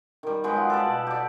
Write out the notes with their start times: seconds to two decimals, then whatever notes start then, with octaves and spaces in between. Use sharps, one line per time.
0.23 D#3 G3
0.44 F#3 G#3 B3 G4
0.56 F4
0.70 A4 B4 D5
0.85 B2
1.07 G4 D5